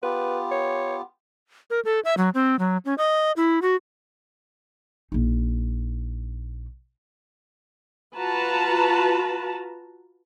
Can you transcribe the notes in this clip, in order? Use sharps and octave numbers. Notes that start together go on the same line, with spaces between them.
B3 F4 G4 B4
C#5
A#4
A4
E5
F#3
C4
F#3
C#4
D#5
E4
F#4
A#1 D#4
F4 F#4 B4 A5 A#5